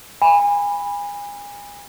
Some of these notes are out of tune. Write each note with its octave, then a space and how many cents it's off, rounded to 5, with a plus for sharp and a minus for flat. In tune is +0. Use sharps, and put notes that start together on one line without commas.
G#5 -30 B5 +0